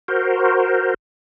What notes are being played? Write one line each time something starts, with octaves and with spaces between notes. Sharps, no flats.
F#4 A#4 C5